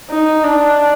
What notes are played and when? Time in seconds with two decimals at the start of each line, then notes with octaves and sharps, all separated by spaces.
0.10 D#4
0.44 D4